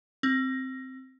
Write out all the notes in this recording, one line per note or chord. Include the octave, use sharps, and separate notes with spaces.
C4